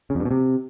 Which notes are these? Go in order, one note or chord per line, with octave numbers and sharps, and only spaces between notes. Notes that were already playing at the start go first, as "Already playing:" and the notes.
C#3
F2
G2
B2
C3